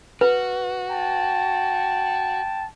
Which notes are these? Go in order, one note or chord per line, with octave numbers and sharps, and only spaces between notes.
F#4 B4
G5 A5